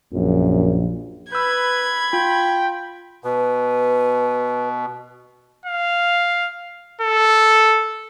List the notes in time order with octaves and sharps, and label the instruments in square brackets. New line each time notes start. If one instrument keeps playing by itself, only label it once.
[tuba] A#1 [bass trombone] F#2
[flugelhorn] B4 [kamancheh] B5 [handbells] E6 G6 [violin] G#6
[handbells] F4 [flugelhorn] G5
[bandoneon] B2 [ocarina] B4
[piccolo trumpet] F5
A4